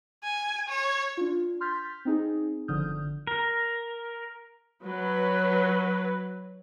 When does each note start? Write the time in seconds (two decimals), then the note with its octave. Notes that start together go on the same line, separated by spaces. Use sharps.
0.24 G#5
0.69 C#5
1.17 D4 F4
1.60 C6 F6 G6 A6 B6
2.05 C4 D#4 G#4
2.68 G1 D3 F3 D#6 F6 G6
3.27 A#4
4.84 F#3 B4